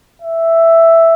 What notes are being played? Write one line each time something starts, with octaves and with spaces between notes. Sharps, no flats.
E5